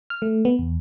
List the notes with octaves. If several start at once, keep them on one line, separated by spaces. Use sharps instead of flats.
F6
A3
B3
E2